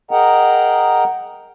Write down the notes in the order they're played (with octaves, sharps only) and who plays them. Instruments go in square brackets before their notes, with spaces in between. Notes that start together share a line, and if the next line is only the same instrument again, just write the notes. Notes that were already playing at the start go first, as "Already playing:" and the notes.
[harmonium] G#4 A#4 D#5 F#5 G5 A#5